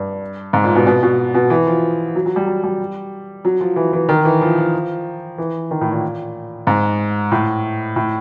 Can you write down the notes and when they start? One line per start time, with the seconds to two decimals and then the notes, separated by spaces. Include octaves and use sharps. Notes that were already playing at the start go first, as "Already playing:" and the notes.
Already playing: G2
0.53 G#2
0.64 A#2
0.75 B2
0.86 B2
1.03 B2
1.34 B2
1.50 E3
1.67 F3
2.16 F#3
2.26 F#3
2.36 G3
2.47 F#3
2.64 G3
3.45 F#3
3.61 F3
3.76 E3
3.93 E3
4.09 D#3
4.25 E3
4.41 F3
4.58 F3
5.38 E3
5.71 D#3
5.81 A2
5.92 A#2
6.67 G#2
7.32 A2
7.96 A2